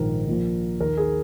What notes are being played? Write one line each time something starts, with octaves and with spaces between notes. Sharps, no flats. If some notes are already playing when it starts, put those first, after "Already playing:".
Already playing: A#1 G#2 D#3 A#4
A#1 A#2 F3
D#2 D#3 A#4
G#4